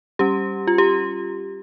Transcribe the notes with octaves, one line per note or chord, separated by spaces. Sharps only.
G3 C#4 G4
F4
G4